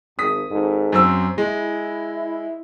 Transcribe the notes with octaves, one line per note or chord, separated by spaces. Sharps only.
G#1 D#6 B6
G#1 G#2 A4
F#2 C4 E6
G#3 E4